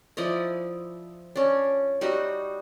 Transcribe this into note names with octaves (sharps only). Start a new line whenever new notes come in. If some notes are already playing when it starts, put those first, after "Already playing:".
F3 E4 D5 D#5
C#4 D4
G3 D#4 F#4